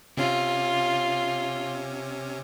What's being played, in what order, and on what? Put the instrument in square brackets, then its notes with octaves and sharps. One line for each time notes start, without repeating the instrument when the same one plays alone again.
[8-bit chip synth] C3 C#4 [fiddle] F4